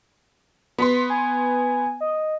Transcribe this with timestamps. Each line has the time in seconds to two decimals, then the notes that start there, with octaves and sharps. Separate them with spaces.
0.78 B3 B4 C6 B6
1.10 G#5
2.01 D#5